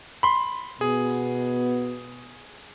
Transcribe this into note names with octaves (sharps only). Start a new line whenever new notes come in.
B5 C6
B2 B3 G#4